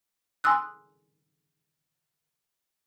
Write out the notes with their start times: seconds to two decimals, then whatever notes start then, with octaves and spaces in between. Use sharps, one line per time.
0.44 G#5 C6 D#6 E6 F#6